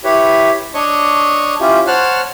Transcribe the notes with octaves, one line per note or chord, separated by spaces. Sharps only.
E4 G4 B4 C#5
D4 C#5 D#5 C#6
C#4 E4 F4 G4
C5 C#5 F#5 A5 F6 F#6